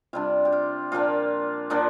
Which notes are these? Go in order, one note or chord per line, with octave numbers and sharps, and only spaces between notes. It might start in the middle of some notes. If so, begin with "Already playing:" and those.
C3 G3 D4 F4
G4
F4
A#2 F3 A#3 D4 F4
A#2 F3 A#3 D4